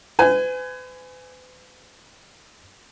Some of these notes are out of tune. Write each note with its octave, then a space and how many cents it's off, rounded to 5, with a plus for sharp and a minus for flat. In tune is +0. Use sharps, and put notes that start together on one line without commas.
B4 +45 G#5 +0